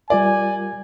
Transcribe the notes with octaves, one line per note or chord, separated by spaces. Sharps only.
G3 F4 A#4 D5 G#5